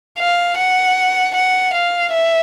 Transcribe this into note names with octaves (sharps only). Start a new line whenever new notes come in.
F5
F#5
F#5
F5
E5